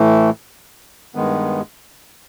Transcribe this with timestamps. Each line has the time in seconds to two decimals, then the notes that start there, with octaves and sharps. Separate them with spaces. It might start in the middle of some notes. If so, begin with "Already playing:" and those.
Already playing: A2 E3 A3
1.15 G2 D#3 G#3 B3